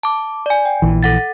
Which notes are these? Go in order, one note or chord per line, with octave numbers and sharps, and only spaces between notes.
A5 D6
D5 G#5
G5
A#1 E3
A4 F#5 A6